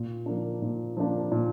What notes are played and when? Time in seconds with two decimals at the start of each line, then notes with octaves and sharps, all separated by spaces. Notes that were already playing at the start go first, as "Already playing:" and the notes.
Already playing: A#2
0.26 F3 A#3 D4
0.62 A#2
0.97 F3 A#3 D4
1.32 A#2